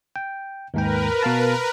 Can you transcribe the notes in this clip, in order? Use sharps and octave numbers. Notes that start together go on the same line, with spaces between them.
G5
D#2 G#2 A#4 B4 G5
B2 F5 A5